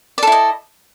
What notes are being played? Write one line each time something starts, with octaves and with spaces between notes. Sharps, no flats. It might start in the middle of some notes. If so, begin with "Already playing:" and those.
E4 A4 D5 D#5